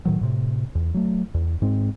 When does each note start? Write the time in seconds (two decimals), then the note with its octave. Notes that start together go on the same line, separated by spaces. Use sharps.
0.05 A2 D#3 F#3
0.21 A2 C3
0.75 E2
0.94 F#3 A3
1.34 E2
1.62 G#2 G#3 C4